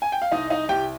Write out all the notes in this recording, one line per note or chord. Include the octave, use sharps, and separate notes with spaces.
G#5
G5
F5
C2 D#4 D#5
D#4 D#5
C2 G4 G5